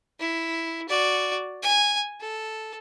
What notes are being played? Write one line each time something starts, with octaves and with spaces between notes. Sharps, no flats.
E4
F#4 D5
G#5
A4